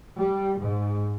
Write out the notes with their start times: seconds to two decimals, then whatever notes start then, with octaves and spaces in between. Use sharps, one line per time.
0.18 G3
0.59 G#2